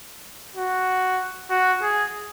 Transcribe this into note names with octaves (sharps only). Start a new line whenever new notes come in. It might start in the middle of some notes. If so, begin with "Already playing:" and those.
F#4
F#4
G#4